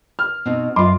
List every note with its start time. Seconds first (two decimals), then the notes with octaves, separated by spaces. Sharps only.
0.19 F6
0.46 B2 C4 D#4
0.76 F#2 F4 D#5 C6 D6